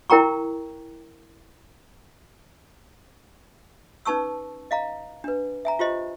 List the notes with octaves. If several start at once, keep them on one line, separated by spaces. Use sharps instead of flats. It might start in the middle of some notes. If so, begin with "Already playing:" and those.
E4 A#4 G5 A#5 C#6
C#4 D#4 B4 A5 C#6 E6
D#5 F5 A#5
D4 B4
E5 G#5 A#5
F4 G4 C5 D#5